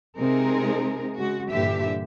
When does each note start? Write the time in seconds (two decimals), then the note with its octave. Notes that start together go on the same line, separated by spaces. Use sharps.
0.19 C3 G#3 C4 D#4 G#4 A#4
1.17 C#3 G#3 F#4
1.50 G2 A#2 D3 E3 G4 E5